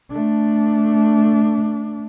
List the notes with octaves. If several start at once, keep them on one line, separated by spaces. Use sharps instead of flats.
A3 D4